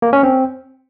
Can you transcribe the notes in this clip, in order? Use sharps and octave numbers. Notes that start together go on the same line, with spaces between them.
A#3
C#4
C4